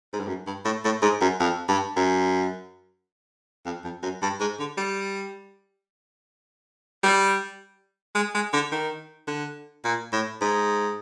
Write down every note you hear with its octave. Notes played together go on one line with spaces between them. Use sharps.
G#2
G2
F#2
G2
A2
A2
G#2
F#2
F2
G2
F#2
F2
F2
F#2
G2
G#2
D3
G3
G3
G#3
G#3
D3
D#3
D3
A#2
A2
G#2